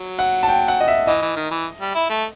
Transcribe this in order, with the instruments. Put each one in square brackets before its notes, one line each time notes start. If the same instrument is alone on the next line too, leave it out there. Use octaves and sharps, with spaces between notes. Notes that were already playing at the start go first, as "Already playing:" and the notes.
Already playing: [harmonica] F#3
[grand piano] F#5
A5
G5
F#5
D#5
E5
[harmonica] E3 [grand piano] D#5
[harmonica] E3
D#3
E3
G3
E4
A3